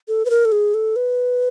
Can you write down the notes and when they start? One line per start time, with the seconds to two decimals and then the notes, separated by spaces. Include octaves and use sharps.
0.08 A4
0.25 B4
0.30 A#4
0.45 A4
0.52 G#4
0.74 A4
0.96 B4